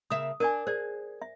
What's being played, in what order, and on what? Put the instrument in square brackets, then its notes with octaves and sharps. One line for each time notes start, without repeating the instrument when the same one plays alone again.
[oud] C#3 A#3 E5 [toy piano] D#6
[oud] D4 [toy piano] A#4 D5 G#5
[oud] G#4 [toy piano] C5 D5
[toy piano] E5